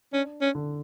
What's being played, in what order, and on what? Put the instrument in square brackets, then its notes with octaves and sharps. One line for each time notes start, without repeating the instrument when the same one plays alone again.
[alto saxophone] C#4 [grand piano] D4
[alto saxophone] C#4
[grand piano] D3